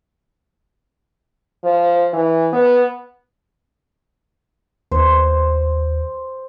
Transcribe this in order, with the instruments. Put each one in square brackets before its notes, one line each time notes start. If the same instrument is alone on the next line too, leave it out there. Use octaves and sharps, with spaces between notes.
[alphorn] F3
E3
B3
[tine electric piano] D#2 [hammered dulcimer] C5